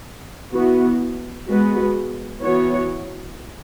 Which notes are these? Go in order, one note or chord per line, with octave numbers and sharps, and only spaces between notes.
E3 B3 F#4
G#3 B3 F#4 B4
E3 B3 F#4 C#5